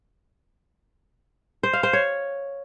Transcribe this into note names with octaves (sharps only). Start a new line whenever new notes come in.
C5
F5
C5
C#5